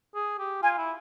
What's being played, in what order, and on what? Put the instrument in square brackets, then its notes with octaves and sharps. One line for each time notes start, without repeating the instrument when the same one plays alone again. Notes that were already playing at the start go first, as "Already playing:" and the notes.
[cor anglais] G#4
G4
[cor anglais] F4 [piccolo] G#5
[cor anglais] E4